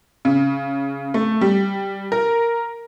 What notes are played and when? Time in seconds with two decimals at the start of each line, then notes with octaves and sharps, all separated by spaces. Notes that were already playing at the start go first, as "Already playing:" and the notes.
0.25 C#3
1.14 A3
1.41 G3
2.12 A#4